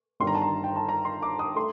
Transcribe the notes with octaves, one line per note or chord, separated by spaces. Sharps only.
G1 G2 D#3 G3 C6
A#5
A5
A#5
G5
A5
A#5
C6
D6
D#6
A3 C6